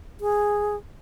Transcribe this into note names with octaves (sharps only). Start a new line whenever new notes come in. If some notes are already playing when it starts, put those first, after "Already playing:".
G#4